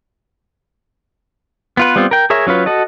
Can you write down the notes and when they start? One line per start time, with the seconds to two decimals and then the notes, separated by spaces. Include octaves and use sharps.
1.77 B3 F4 B4
1.96 G3 B3 C4 F4
2.11 A#4 G5
2.30 G#4 A#4 C#5 E5
2.47 F#3 C#4 F4 B4
2.66 F#4 A4 D#5